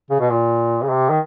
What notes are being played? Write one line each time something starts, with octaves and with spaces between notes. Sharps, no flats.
C#3
B2
A#2
C#3
C3
D#3